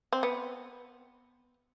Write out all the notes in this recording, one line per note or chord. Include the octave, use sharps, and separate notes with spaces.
C4
B3